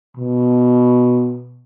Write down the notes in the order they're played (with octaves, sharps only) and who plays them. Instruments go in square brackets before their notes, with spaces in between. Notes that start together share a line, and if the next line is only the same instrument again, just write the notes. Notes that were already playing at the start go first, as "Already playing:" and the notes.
[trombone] B2